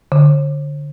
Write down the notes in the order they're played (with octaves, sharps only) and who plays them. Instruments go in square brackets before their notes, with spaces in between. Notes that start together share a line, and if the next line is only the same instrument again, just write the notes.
[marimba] D3